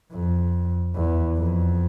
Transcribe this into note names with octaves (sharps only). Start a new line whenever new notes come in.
F2
E2
F2